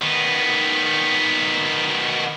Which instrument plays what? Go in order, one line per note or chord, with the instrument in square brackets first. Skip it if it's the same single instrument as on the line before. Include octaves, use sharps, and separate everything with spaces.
[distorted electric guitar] D#3 B3